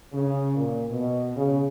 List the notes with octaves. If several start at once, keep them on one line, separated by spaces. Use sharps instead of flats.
C#3
A#2
B2
C#3